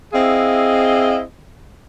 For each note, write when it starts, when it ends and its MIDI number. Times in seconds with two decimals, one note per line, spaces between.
0.13 1.20 60
0.13 1.20 64
0.13 1.20 68
0.13 1.20 75
0.13 1.20 77